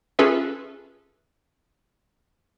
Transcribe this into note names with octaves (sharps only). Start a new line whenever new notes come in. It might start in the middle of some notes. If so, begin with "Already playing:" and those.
C#4 F4 G#4 A4 B4 E5